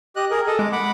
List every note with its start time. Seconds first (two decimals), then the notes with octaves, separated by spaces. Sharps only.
0.16 G4 D#5 F#6
0.31 G#4 A#4
0.47 A4 D#5
0.59 G#3 D6
0.72 F#5 B5 D6